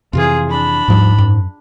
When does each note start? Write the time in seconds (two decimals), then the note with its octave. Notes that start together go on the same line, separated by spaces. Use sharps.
0.13 F2 C3 E3 F4 G#4
0.49 D4 B5
0.88 D#2 G#2 F3 G3
1.18 F#2